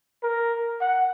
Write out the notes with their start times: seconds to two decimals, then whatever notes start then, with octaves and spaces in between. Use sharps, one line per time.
0.23 A#4
0.81 F#5